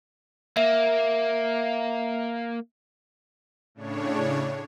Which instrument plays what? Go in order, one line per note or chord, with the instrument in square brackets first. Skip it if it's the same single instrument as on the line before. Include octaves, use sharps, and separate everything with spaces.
[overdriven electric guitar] A#3 [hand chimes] E5
[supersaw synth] A2 C#3 D4 C#5